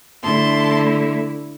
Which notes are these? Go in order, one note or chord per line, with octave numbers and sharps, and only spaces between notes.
D3 A3 E4 A5 C6